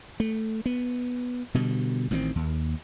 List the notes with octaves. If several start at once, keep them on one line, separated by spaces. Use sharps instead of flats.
A3
B3
B2 D3 G3
A1 D#3 A#3 C4
D#2